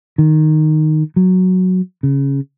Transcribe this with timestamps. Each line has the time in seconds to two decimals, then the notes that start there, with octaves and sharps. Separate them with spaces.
0.18 D#3
1.16 F#3
2.03 C#3